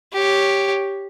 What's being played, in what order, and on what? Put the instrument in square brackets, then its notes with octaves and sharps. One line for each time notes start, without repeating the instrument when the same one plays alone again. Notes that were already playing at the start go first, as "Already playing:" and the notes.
[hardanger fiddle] G4 C#5